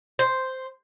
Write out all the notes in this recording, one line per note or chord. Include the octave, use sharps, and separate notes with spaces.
C5